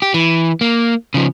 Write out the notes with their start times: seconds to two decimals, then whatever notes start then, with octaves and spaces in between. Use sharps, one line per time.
0.02 G4
0.14 E3
0.61 A#3
1.14 C#3 F3